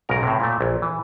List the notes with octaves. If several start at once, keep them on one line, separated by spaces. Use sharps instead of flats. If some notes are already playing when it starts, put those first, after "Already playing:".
B1 G#2 C#3 A#4
A2 C3
A#2 A3
A#1
E3